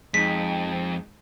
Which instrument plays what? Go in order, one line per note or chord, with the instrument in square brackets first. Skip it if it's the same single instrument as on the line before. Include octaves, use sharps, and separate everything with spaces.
[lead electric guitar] F2 [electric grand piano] G#3 D#4 [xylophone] B6